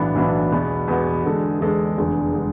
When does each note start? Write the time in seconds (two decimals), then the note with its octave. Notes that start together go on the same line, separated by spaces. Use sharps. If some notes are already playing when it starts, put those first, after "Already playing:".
Already playing: B1 A2 E3 B3 D4
0.15 B1 A2 E3 B3 D4
0.52 E2 B2 B3
0.88 E2 B2 B3
1.25 E2 D3 G#3 D4 A4
1.61 E2 D3 G#3 D4 A4
1.98 F1 E2 D3 G#3
2.34 D3 G#3